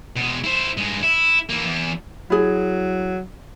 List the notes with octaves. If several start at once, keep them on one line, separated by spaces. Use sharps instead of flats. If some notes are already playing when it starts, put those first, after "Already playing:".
B2 G#3
E4 C5
G2 G#3
E4
E3 A#3
E2
F#3 E4 G#4